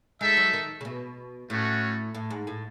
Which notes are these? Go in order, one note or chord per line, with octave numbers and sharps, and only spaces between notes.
G#3 D#4 A4 E5
F#3
D#3
C#3
B2
A2 A3 C#4 F#4
A2
G#2
A2